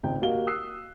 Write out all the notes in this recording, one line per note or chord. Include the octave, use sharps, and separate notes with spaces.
G#1 C#2 G5
A#3 F#4 G4 D#5 F5 G7
D#6 E6 F#6 C7